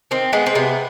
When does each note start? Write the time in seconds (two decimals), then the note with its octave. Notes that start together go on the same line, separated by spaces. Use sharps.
0.11 D#3 C4
0.33 G#3 B3
0.46 C4
0.55 C3 B3